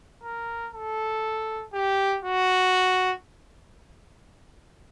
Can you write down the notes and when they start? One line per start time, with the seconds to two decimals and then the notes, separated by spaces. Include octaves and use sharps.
0.24 A#4
0.74 A4
1.74 G4
2.24 F#4